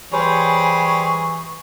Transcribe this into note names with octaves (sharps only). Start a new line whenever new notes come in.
E3 G3 G#4 C5 C#5 C#6